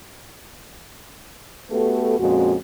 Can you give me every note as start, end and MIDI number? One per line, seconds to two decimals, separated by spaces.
1.70 2.19 57
1.70 2.19 59
1.70 2.19 66
1.70 2.19 67
1.70 2.19 69
1.70 2.19 71
2.19 2.55 41
2.19 2.55 46
2.19 2.55 56
2.19 2.55 61
2.19 2.55 66